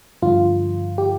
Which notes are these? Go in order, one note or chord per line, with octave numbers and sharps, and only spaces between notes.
G2 D3 F3 F4
G4